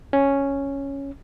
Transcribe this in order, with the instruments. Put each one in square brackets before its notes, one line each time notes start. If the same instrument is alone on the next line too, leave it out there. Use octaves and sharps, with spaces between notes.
[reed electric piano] C#4